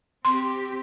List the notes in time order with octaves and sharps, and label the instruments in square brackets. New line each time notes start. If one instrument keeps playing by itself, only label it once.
[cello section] C4 G4 [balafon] C6